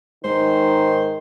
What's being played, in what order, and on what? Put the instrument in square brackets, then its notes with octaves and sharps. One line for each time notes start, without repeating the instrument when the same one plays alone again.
[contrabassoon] G#2 [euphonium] D#3 [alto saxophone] C5